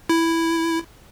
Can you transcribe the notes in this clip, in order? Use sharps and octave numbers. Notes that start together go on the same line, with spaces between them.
E4